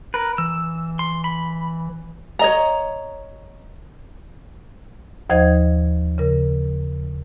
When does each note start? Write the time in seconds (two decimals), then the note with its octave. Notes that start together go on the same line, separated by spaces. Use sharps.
0.14 A#4 B4
0.38 E3 E6
0.99 C6
1.24 B5
2.39 C#5 D#5 A#5
5.30 D#2 F3 D#4 C5 D#5 G#6
6.18 C#3 A#4